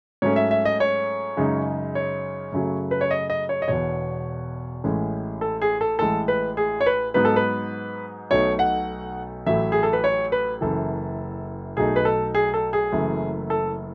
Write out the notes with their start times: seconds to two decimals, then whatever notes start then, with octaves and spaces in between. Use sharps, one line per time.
0.22 G#2 F#3 A3 C#4 C#5
0.36 E5
0.51 E5
0.65 D#5
0.80 C#5
1.37 F#2 C#3 G#3 D#4
1.95 C#5
2.52 F#2 C#3 F#3 A3
2.91 B4
3.01 C#5
3.11 D#5
3.30 D#5
3.49 C#5
3.62 D#5
3.68 E1 E2 B2 C#5
4.84 A1 A2 G#3 C#4
5.41 A4
5.62 G#4
5.81 A4
5.99 A1 A2 G#3 A4
6.28 B4
6.57 G#4
6.81 C#5
6.86 B4
7.14 G#2 F#3 B3 D#4 B4
7.25 A4
7.36 B4
8.31 B1 B2 A3 D#4 C#5
8.59 F#5
9.46 A1 A2 F#3 A3 E5
9.72 G#4
9.83 A4
9.93 B4
10.04 C#5
10.32 B4
10.61 F#1 F#2 E3 A4
11.77 B1 B2 A3 D#4 G#4
11.96 B4
12.05 A4
12.35 G#4
12.54 A4
12.73 G#4
12.92 F#1 F#2 E3 A3
13.50 A4